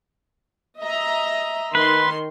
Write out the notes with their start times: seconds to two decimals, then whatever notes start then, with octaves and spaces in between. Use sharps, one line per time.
0.80 D#5 E5 A#5
1.75 D#3 B4 C6